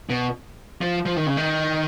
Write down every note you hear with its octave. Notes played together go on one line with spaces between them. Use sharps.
B2
F3
F3
D#3
C#3
D#3